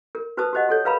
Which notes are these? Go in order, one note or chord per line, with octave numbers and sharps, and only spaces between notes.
A#4
F#4 B4 C5 A5 D#6 E6
F#4 G4 C5 D#5 F#5
F#4 A4 C#5
A#4 B4 F5 A#5 B5